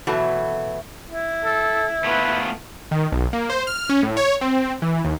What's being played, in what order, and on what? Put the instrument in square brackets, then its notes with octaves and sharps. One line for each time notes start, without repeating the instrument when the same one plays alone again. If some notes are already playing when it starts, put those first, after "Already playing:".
[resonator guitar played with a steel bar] B2 E3 F#3 A3
[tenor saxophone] E4
[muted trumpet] A4
[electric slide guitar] A3 B3 F4 [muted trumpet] B4
[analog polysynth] D#3
B1
A#3
C5
F6
C#4
A2
C#5
C4
E3
D#2